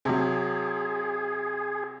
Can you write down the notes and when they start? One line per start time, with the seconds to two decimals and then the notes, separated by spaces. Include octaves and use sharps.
0.05 C3 F#3 G#4